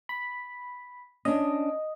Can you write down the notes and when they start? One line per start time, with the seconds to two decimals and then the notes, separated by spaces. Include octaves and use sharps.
0.09 B5
1.25 C#4 D4 D#5